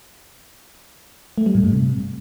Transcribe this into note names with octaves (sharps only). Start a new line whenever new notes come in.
A3
G3
A2
G2
C3